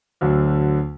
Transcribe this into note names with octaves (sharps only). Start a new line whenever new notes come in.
D2 D3 F#3